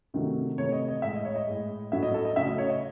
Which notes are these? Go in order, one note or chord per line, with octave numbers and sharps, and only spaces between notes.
C3 D#3 F#3 A3
C3 E3 A3 C#5
D#5
D#5
A2 G#3 E5
D#5
C#5
D#5
A2 G#3
A2 F#3 A3 E5
D#5
A4
D#5
C#3 F#3 A3 E5
D#5
C#5
D#5